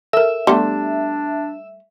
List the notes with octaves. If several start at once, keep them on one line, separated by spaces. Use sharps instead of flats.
A4 A#4 E5
G3 A3 B3 D4 G4 C6